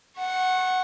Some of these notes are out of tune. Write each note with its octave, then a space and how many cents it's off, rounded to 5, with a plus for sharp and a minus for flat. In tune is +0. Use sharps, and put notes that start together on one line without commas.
F#5 +0 C#6 -35